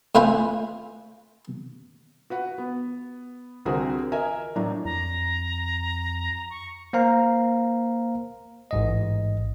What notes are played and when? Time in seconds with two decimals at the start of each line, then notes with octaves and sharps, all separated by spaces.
0.15 A2 F4 B4 C5 E5 G#5
2.30 F#4 B4 F#5
2.58 B3
3.65 C2 D3 C4 F#4 G#4 A#4
4.12 A#4 D#5 E5 G#5
4.56 A2 F#3 D4 F#4 A#5
4.85 F2 A#5
6.50 C#6
6.93 A#3 C5 F5 A#5
8.71 A1 G#2 D#5